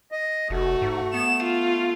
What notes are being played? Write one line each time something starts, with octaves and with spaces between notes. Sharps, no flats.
D#5
F1 A3 F#4
G#2
B3 E7
F4